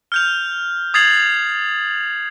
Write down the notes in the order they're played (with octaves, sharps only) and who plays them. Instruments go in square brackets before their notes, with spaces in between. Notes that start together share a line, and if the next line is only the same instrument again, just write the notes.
[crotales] F6 G6 F7
D#6 G#6 A6 C7 F7 F#7